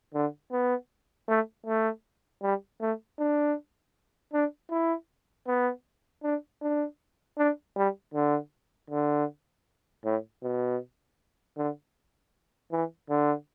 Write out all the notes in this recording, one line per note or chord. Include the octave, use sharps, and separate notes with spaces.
D3
B3
A3
A3
G3
A3
D4
D4
E4
B3
D4
D4
D4
G3
D3
D3
A2
B2
D3
E3
D3